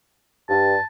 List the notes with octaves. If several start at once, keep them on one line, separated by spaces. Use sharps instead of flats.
G2 A5